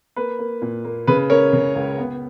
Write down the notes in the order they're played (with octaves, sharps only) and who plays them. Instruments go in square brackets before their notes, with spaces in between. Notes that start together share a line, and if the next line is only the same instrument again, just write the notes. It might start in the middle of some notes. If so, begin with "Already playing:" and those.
[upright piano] A#3 B4
A#3
A#2
A#3
C#3 B4
C#4 A#4 C#5
C#3
C#2
B3